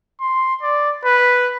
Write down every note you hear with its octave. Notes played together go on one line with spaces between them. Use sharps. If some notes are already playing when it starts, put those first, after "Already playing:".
C6
D5
B4